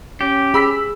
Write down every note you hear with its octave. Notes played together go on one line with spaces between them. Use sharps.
C#4 G4
G#4 B5 E6 B6